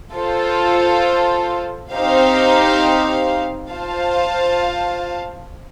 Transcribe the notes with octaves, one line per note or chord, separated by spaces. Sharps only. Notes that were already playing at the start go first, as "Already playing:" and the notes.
F4 A4 C5
C4 D#4 G4 C5 F5
F4 C5 F5 A5